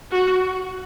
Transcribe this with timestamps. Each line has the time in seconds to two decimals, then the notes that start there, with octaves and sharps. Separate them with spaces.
0.12 F#4